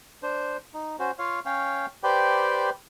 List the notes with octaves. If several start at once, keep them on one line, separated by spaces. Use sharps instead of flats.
D4 C5
D#4
C#4 F#4 C5
F4 C#5 F5
C#4 C#5 F5 G5
G4 B4 C5 D5 G5